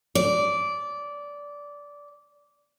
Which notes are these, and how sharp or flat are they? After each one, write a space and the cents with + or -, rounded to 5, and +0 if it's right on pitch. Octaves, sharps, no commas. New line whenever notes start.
D5 -15